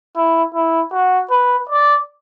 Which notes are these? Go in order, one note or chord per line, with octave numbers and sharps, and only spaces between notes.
E4
E4
F#4
B4
D5